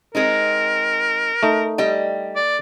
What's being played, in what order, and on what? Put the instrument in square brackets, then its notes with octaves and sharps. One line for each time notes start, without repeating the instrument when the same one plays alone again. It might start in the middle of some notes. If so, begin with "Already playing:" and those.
[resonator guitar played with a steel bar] G#3 C4 D#4 [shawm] A#4
[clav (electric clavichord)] A3 D#4
[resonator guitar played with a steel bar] G3 D#5 G5
[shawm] D5